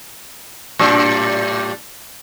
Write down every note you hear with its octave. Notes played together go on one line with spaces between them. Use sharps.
A2 G3 D4